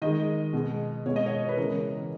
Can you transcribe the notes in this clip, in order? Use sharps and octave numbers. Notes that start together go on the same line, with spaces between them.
D#3 G#3 D#5
B2 G#3
B2 G#3 C#5
D#5
C#5
B4
C#3 E3 G#3 A#4